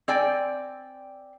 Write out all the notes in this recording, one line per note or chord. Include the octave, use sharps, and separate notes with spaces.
C4 D5 G5 G#5